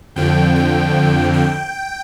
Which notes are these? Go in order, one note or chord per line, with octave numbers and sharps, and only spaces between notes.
F2 D3 F3 G5
G5
G5